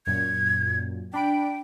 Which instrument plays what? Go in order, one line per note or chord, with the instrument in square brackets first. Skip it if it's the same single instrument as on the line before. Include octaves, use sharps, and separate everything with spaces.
[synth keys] F#2 A#2 [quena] G#6
[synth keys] D4 B5 D7 [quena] G5